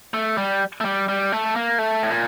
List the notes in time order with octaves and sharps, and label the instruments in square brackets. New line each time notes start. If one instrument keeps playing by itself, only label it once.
[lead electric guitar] A3
G3
A3
G3
G3
A3
A#3
A3
A2
A#2